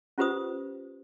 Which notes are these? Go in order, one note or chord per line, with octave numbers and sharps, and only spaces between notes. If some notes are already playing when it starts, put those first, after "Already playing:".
C#4 F4 G4 B4 C5 D#6